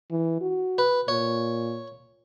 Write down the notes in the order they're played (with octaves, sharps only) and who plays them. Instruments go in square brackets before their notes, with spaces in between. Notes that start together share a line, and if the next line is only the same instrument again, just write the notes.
[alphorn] E3
F#4
[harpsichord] B4
[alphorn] A#2 [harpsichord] C#5